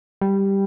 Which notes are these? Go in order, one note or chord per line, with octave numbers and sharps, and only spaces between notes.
G3